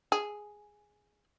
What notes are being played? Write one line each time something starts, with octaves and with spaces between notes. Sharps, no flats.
G#4